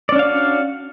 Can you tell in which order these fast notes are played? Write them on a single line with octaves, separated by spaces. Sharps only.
D5 C#4 D4 F5 F#4